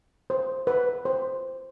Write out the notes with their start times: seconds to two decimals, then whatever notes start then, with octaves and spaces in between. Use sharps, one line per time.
0.30 C5
0.67 B4
1.05 C5